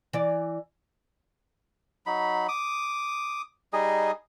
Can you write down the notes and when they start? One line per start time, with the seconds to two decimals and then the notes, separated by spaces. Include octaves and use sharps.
0.13 E3 D5
2.06 F#3 D#4 B5
2.48 D6 D#6
3.73 G3 D#4 G#4 D#5